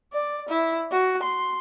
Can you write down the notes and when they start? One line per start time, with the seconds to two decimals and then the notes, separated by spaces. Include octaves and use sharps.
0.13 D5
0.49 E4
0.92 F#4
1.23 C6